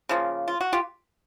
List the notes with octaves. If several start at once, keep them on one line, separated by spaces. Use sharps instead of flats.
C#3 F3 A#3
F4
F#4
F4 G4